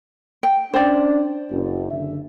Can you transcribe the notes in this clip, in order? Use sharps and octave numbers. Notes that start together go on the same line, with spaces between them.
G5
C#4 D4 C5 D5
F#1 F#2
F#1 D3 E5